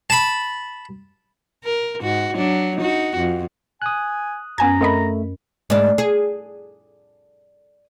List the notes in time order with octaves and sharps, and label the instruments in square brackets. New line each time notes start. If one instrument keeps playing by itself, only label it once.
[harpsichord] A5 B5
[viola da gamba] A#4
G#2 F#4
F#3 D4
D#4 F#4
F2
[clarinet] G#5 [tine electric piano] D#6 F#6
[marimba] F#2 C#4 [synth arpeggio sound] B3 G#5 G#6 [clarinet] A#5
[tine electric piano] A3 [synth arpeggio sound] C4 D#5 B5 [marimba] A#4
[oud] G#2 D4
G#4